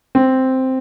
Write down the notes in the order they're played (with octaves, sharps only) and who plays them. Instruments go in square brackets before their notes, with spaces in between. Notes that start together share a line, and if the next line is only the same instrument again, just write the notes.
[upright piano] C4